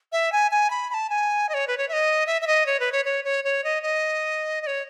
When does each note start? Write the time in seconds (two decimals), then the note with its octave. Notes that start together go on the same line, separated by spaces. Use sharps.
0.12 E5
0.32 G#5
0.51 G#5
0.70 B5
0.90 B5
0.94 A5
1.10 G#5
1.49 D#5
1.54 C#5
1.68 B4
1.78 C#5
1.89 E5
1.93 D#5
2.27 E5
2.42 E5
2.47 D#5
2.66 C#5
2.80 B4
2.92 C#5
3.05 C#5
3.25 C#5
3.44 C#5
3.64 D#5
3.83 D#5
4.62 D#5
4.67 C#5